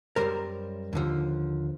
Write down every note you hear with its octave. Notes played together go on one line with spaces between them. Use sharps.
F#2 D#3 G3 A#4 C5
D#2 D3 F3